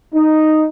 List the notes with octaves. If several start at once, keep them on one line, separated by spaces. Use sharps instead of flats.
D#4